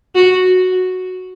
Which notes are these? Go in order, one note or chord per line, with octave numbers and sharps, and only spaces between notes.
F#4